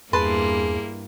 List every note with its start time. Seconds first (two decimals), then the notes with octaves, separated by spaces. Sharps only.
0.13 E2 G2 A#3 E4 G#4 B4 A5 C6